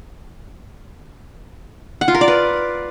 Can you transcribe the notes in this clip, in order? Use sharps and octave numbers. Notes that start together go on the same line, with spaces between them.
F#5
F4
A#4
D5
B4